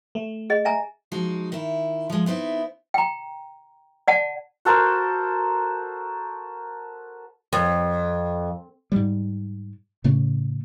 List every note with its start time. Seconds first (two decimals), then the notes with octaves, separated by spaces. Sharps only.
0.15 A3
0.50 G#4 D#5
0.65 E5 G#5 A#5
1.12 F3 G#3 D#4 F#4
1.52 D#3 E4
2.10 F3 G#3
2.26 B3 C4 D#4 E4
2.94 G5 A#5
4.08 D5 F#5 A5
4.65 F#4 A4 A#4 C5
7.53 F2
8.92 G#2 G3
10.04 A2 C#3 A3 C#4